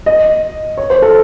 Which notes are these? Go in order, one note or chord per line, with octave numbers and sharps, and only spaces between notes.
D#5
C#5
C5
A4